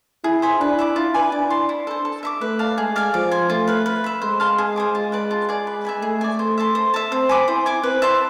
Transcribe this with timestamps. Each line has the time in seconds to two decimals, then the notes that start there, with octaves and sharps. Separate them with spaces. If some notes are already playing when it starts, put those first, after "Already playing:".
0.24 E4 G#4
0.42 C5 G#5 B5
0.60 D4 B4
0.79 E5 B5 D6
0.96 E4 F4
1.14 B4 D5 G#5
1.32 D4 D5
1.50 A5 C6
1.69 E4
1.87 A4 C5
2.05 A4
2.23 E5 B5 D6
2.41 A3 B4
2.59 D5 F5 A5
2.78 G#3 G#4
2.96 D5 F5 G#5
3.14 F3 D5
3.31 G#5 C6
3.50 A3 F4
3.68 B4 F5
3.86 B4
4.04 E5 B5
4.22 G#3 C5
4.40 F5 A5 C6
4.58 G#4
4.76 C5 G#5 D6
4.95 G#3 F4
5.12 B4 D5 A5
5.31 F4
5.49 G#4 D5
5.67 B4
5.85 E5 G#5 B5
6.02 A3 G#4
6.21 D5 G#5
6.39 C5
6.58 E5 A5 C6
6.75 C5
6.94 E5 A5
7.11 C4 C5
7.29 G#5 B5 D6
7.48 E4 C5
7.66 G#5 D6
7.83 C4 B4
8.02 E5 A5 C6